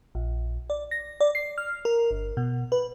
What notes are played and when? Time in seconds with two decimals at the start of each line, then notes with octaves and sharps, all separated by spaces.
0.15 A#1
0.70 D5
0.91 A#6
1.20 D5
1.35 C7
1.58 F6
1.85 A#4
2.11 G1
2.37 B2
2.72 B4